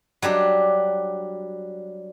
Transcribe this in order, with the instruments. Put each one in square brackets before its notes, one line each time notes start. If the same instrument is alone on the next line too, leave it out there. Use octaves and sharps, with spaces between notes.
[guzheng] F#3 G3 D4 G4